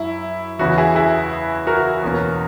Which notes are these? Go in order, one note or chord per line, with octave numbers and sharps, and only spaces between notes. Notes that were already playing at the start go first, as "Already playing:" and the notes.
Already playing: F#2 E4
E2 C#3 E3 F#4
E4 G#4
E4 G#4
F#4 A#4
E2 B2 A#3 C#4